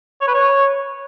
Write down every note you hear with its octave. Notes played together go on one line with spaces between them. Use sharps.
C#5
B4
C#5